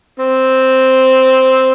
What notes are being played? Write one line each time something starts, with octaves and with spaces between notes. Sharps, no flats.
C4